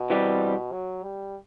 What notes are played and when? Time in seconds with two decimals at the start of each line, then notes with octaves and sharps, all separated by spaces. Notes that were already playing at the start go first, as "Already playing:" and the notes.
Already playing: B2
0.10 E3 G3 C4 G4
0.72 F#3
1.03 G3